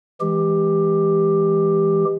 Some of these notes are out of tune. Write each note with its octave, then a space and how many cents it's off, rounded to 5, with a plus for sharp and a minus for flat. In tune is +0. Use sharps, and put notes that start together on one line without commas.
E3 +0 G#3 +5 G4 +10